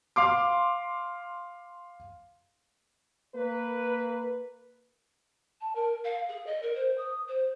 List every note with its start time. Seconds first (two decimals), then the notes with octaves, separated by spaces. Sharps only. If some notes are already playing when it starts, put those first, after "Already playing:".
0.16 F5 C6 D6
3.35 A#3 B4
5.61 A5
5.75 A#4
6.04 F5
6.29 G#4
6.46 D#5
6.62 A#4
6.75 C5
6.97 D#6
7.28 C5